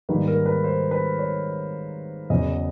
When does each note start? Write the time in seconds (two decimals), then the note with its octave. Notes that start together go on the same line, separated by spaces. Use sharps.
0.09 G#2 D#3 G3 A#3 B4
0.27 A#4
0.46 B4
0.64 C5
0.91 B4
1.19 C#5
2.30 E2 C#3 F#3 B3 D#5